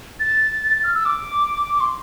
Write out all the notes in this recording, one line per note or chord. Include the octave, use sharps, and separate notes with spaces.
A6
F6
E6
D6
D6
C6